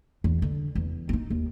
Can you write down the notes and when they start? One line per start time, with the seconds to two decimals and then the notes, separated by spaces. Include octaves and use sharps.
0.24 E2
0.42 D3
0.75 E2 E3
1.09 C4 D#4
1.30 D#2